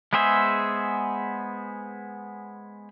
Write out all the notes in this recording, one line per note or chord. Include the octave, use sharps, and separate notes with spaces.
G#3 B3 G#4 C5 E5